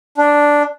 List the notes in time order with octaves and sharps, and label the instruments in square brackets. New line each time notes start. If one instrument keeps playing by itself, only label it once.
[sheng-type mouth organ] D4